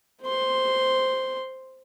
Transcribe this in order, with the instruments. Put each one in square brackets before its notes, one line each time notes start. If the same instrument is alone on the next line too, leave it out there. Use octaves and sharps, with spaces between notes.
[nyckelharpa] C5 C6